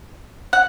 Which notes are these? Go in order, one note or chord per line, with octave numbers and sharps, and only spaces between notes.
F#5